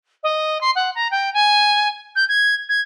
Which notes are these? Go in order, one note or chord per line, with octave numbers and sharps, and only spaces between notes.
D#5
C6
F#5
A#5
G5
G#5
G6
G#6
G#6